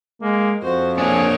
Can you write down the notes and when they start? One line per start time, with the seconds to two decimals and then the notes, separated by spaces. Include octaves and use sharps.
0.22 G#3 A#3
0.63 F2 F#4 C5
0.98 A#3 D4 G#4 C#5